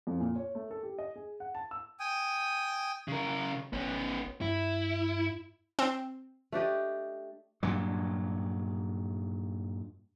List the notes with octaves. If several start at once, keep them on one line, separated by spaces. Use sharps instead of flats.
F2
A#2
C#5
A3
A4
G4
D#5
G#4
F#5
A5
E6
G5 G#5 D#6
C#3 A#4
G#1 B3 C#4
G2 E4
C4
A3 D4 G4 D#5
G2 A#2 F#3